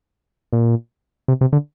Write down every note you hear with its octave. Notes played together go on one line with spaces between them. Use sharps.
A#2
C3
C3
D3